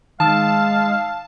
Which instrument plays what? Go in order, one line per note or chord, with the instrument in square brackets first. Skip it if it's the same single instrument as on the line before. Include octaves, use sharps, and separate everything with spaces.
[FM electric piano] D#3 D#6 E6 [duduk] G#3 [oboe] F5 [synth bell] A5